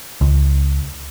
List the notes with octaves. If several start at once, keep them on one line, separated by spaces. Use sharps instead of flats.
C#2